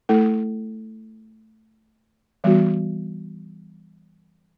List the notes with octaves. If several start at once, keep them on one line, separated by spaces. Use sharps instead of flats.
A3 E4 A4
E3 G3 B3 F#4